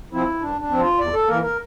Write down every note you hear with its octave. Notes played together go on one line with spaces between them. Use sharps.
F3 C4 E4
G2 D4
D4
F3 C4
F4
E2 D5
A4
E3 A#3 A#4
A#4